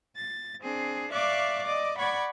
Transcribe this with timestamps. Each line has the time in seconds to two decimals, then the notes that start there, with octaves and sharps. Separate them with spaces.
0.15 A6
0.61 C4 D4 G#4
1.11 D5 E5 F5 C#6 D6 F#6
1.64 D5 D#5 D6
1.98 D5 F#5 B5 C#6 G#6